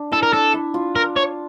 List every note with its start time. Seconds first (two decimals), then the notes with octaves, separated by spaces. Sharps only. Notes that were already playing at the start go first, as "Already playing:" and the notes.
Already playing: D4
0.12 E4 A4
0.23 A#4
0.33 D4 A4
0.54 E4
0.74 F4
0.95 A#4
1.17 C#5